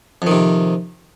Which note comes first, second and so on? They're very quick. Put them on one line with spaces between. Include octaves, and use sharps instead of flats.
F2 D#3 C3